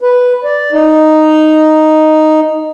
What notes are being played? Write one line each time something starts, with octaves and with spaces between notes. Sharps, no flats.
B4
D5
D#4